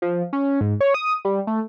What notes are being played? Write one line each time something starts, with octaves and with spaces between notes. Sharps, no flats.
F3
C#4
G#2
C#5
D#6
G3
A3